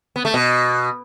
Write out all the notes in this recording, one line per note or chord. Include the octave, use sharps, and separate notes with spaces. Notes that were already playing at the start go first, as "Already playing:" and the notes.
B3
A3
B2